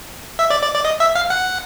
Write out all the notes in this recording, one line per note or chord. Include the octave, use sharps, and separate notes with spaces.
E5
D5
D5
D5
D#5
E5
F5
F#5